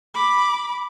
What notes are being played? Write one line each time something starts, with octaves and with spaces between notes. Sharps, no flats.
B5 D6